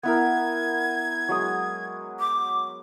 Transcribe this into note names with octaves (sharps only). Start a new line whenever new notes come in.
B3 E4 A#4 G#6
F#3 G#3 D#6
D6